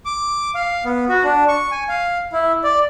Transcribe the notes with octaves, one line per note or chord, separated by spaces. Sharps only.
D6
F5
B3
F#4
D4
C#6
G#5
F5
E4
D5